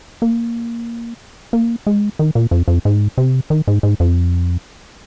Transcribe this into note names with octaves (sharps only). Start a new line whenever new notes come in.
A#3
A#3
G#3
D#3
A#2
F2
F2
G#2
C3
D#3
G#2
G#2
F2